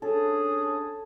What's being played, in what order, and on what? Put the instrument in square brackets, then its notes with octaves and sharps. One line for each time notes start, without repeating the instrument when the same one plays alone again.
[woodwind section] C#4 D4 G#4 [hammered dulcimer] A4